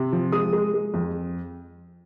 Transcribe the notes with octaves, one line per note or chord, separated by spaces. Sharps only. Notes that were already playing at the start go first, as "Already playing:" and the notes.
Already playing: C3
F3
G#3 D#6
G#3
G#3
F2